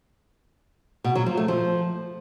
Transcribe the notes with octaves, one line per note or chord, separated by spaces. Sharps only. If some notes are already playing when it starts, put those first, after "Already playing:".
B2
F#3
F3
A3
F3